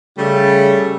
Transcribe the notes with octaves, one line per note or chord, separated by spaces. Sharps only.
C#3 G3 A3